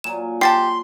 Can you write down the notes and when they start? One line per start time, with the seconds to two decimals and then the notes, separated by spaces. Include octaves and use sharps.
0.04 A#2 F#3 G#5 E7
0.41 G4 A5 C6 A6 C7